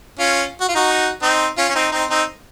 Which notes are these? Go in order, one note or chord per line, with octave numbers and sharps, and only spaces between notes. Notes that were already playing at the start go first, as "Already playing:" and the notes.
C#4 F4
F#4
F4
D#4 F#4
C4 D#4
C#4 F4
C#4
C4 D#4
C4 D#4
C4 D#4